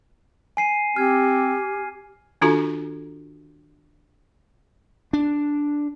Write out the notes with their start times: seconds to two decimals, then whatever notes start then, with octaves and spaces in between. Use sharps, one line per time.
0.57 G#5 C7 D#7
0.96 C4 G4 F6 G#6
2.41 D#3 D4 F4 F#4 A4 A#5
5.13 D4